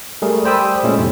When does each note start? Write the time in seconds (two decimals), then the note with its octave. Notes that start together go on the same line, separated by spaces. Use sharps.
0.22 G3 A3 G#4 A#4
0.45 C5 D5 G5 B5 D#6 E6
0.83 A#2 G#3 A3 C#4
0.98 F2 A2 C3